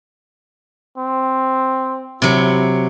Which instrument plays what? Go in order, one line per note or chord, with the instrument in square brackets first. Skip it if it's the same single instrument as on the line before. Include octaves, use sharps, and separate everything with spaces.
[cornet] C4
[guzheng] C3 F#3 [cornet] E4